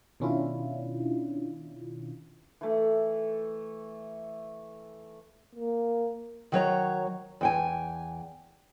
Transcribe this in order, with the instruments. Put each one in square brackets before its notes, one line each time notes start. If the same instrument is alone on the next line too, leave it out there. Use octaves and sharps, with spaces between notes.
[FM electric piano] B2 D#3 C#4 D4 E4 F4
[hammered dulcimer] E3 A3
[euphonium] A#3
[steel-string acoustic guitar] D#3 F#3 C#5 A#5
E2 G5 G#5